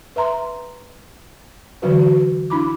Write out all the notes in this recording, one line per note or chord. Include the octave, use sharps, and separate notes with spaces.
B4 E5 A#5 C6
D3 E3 F#3 F#4 B4
F#4
D4 E4 B5 D6